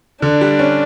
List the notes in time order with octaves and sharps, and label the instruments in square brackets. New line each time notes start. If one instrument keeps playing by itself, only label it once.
[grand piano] D3 [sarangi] D4
[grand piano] G3
C#4